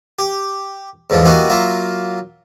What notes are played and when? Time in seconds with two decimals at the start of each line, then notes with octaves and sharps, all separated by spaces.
0.19 G4
1.10 E2 G#2 D3 F3
1.25 G3 A#3 B3 D#4 E4 F#4
1.50 F#3 A#3 F4 E5